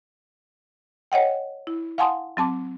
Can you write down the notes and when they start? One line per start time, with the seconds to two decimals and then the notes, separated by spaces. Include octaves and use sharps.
1.12 C#5 D#5 F#5 G5
1.67 E4
1.98 F5 F#5 G#5 A5 C6 D#6
2.37 F#3 C4 A5 D6